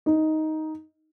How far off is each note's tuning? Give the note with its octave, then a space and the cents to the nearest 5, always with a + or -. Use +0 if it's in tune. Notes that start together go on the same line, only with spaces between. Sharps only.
D#4 +10